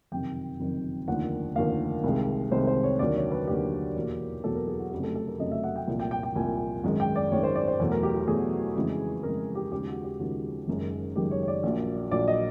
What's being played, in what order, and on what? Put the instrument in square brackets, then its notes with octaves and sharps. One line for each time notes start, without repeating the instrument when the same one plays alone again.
[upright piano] F#1 F2 C3 D#3 G5
F#1 F2 C3 D#3
F1 D#2 D3 F3 A#3 F#5
F1 D#2 D3 F3 A#3 F5
C2 C3 D#3 G#3
C2 C3 D#3 G#3 C5
C5
C#5
D#2 D3 F#3 A#3 D5
C#5
B4
D#2 D3 F#3 A#3 G4
E2 B2 F#3 A#3
E2 B2 F#3 A#3 A4
A#4
G#4
F#4
F1 F2 C#3 F#3 A3 G4
A4
A4
A#4
F1 F2 C#3 F#3 A3 D#5
E5
F#5
G5
C2 A#2 F3 A#3
G5
G5
G5
C2 A#2 F3 A#3 G#5
G#1 F#2 D#3 G#3
G5
D5
G#1 F#2 D#3 G#3 C#5
C5
D5
C5
E2 B2 F#3 A3
A#4
G4
G4
E2 B2 F#3 A3 G#4
F2 C#3 E3 G#3
F2 C#3 E3 G#3 A#4
G4
D#2 C#3 F3 G#3 G4
F#4
G4
D#2 C#3 F3 G#3 F#4
F#1 F#2 D#3 G#3
F#1 F#2 D#3 G#3 G4
C#5
C#5
D5
A#1 A#2 F#3 A#3
A#1 A#2 F#3 A#3 D5
D#5